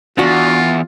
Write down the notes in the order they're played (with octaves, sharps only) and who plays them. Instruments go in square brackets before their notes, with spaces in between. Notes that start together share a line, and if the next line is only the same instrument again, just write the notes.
[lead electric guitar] E2 [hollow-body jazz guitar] D4 F#4 [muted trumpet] F4